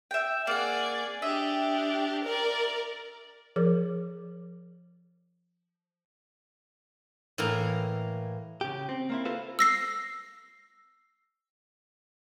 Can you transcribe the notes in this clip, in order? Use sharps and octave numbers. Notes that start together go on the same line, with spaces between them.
E5 G5
A#3 G#4 D5 F#5
D4 G4 D#5 E5
A#4 D5
F3 G#4 A#4 D5 D6
A2 E3 A#3 F5 A#5
C#3 G4
C4
A#3 C4 E4
F4 A4 B4 C5 F5
E6 A#6 C7